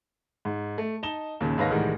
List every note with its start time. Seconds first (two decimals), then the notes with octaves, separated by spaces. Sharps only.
0.45 G#2
0.78 A3
1.03 D#4 D#5 A5 E7 G7
1.40 D#2 A#2 C#3
1.58 D#2 G#2 B4 C#5 F5 A#6
1.70 C2 A2 D#3 E3 G3 G#3